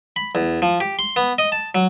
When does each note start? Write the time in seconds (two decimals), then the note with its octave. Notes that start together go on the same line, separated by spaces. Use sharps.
0.16 B5
0.35 E2
0.62 F3
0.80 G4
0.99 C6
1.16 B3
1.38 D#5
1.52 A5
1.75 F#3